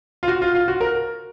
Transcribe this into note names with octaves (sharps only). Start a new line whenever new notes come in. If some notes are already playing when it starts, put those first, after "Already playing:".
F4
F#4
F4
F4
F#4
A#4